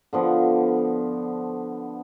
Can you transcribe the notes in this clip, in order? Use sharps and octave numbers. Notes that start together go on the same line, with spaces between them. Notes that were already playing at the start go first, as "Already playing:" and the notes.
D3 F3 B3